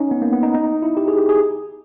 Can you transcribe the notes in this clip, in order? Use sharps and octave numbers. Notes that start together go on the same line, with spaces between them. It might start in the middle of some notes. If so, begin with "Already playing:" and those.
Already playing: C#4 D#4
B3
A#3
B3
D#4
D#4
E4
G4
G#4
G4
G#4